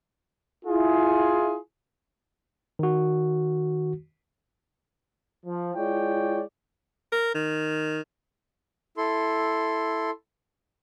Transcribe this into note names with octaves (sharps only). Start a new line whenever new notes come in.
E4 F4 G#4
D#3 F#4
F3
G#3 E4 F4 C#5 D5 G5
A#4
D#3
E4 A4 C6